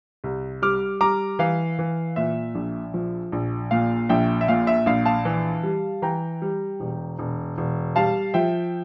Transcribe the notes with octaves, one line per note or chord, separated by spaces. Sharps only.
C2
G3 D6 F6
G3 A#5 D6
E3 F5
E3
A#2 E5
A#1
F3
A#1
A#2 F5
A#1 E5 G5
E5
A#2 F5
E5
A#1 F5
F5 A5
E3
G3
E3 G5 A#5
G3
E1
E1
E1
G3 F5 A5
F3 E5 G5